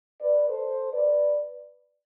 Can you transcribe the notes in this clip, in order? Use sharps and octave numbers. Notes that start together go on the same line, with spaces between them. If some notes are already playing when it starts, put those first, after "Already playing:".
B4 D5
A4 C5
B4 D5